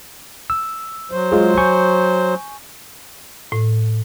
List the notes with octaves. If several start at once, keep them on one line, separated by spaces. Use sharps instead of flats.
E6
F#3 C5
G#3 F4 G#4
G#5 C#6 G6
A2